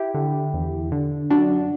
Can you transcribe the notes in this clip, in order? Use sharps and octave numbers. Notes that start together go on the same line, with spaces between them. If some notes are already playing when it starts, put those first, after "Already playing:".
Already playing: E4 G4
D3
E2
D3
F#2 D4 F#4